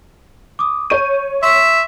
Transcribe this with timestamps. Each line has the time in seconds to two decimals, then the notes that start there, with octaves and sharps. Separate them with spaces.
0.59 D6 D#6
0.90 C#5 C#6 G6 D#7
1.43 E5 C6 C#6 B6